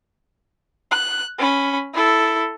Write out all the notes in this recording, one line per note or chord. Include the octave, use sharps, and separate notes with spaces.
F#6
C#4 B5
E4 A4